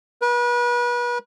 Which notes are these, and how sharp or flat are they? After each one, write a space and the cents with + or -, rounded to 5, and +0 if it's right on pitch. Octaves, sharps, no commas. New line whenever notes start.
B4 -35